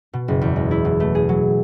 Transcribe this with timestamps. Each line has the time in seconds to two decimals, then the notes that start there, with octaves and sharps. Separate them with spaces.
0.13 B2
0.28 F#1
0.41 E2
0.56 G#3
0.71 E4
0.85 B2
1.00 A3
1.15 G#4
1.29 F#3